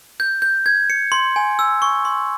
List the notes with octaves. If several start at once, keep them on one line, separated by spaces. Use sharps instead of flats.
G6
G6
G#6
C#7
C6
G#5
E6
C#6
C6